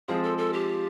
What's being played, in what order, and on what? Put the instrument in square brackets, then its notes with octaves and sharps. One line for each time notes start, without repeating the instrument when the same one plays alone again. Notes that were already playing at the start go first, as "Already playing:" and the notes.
[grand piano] F3 G#3 C4 F4 [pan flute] G#4
[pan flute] A4
A4
G4